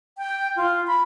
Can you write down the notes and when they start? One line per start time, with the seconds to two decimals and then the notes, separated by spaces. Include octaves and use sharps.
0.18 G5
0.56 F4
0.87 B5